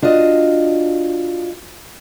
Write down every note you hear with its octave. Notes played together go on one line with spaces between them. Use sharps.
D4 F4 F#4 D#5